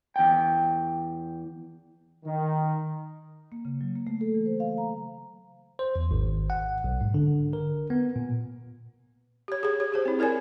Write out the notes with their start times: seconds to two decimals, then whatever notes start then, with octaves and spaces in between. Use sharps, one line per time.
0.16 E2 G5
2.25 D#3
3.52 A#3
3.65 C#3
3.81 F#3
3.95 A#3
4.07 A3
4.21 A4
4.35 E3
4.46 C5
4.60 F5
4.78 A#5
5.79 C5
5.96 E2
6.11 G#1
6.50 F#5
6.84 B1
7.01 G#2
7.14 D3
7.53 A#4
7.90 B3
8.16 A#2
9.48 G4 C#5
9.63 G#4 C#5
9.80 G4 C#5
9.92 G4 G#4 C5
10.05 C4 E4
10.19 E4 A#4 C#5 D5 G#5